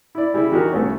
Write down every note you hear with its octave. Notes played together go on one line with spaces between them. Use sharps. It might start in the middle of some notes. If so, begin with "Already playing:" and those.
E4 D5
C#3 G3 E4
E2 D#3 F#4 G4 A#4
C2 A3 C#4